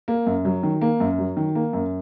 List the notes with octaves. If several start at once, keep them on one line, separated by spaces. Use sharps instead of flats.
A#3
F#2
F#3
D#3
A#3
F#2
F#3
D#3
A#3
F#2